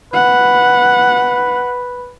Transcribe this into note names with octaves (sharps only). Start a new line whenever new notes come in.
B4 F#5